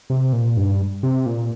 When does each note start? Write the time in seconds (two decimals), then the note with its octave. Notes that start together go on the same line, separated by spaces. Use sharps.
0.10 C3
0.33 A#2
0.57 G2
1.03 C3
1.26 A#2